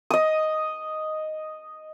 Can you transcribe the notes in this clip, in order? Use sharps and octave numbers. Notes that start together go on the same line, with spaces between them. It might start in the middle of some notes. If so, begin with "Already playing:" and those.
D#5 D#6